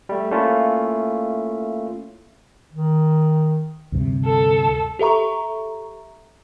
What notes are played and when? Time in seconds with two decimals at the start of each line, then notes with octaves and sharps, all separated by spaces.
0.09 G3 A3
0.31 A3 A#3 C#4 E4 F4
2.73 D#3
3.92 D2 G2 C3
4.25 A4
4.99 G4 A4 E5 A#5 C#6